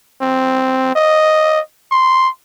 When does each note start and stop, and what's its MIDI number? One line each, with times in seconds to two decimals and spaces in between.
0.22 0.94 60
0.95 1.60 75
1.91 2.29 84